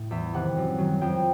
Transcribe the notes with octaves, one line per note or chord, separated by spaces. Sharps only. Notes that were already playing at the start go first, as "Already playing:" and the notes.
Already playing: A2
E2 E5
C3 D#3 F#5
F#2
D#3 F#3
F2 G5